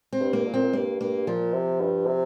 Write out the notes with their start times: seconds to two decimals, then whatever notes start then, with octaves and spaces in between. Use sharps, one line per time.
0.13 C4
0.20 G2
0.33 A#3
0.47 A#2
0.54 C4
0.63 A#2
0.73 G2 A#3
1.00 G2 A#3
1.27 A#2 F3
1.54 C3
1.81 G2
2.07 C3